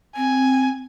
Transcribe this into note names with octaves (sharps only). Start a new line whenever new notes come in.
C4 G#5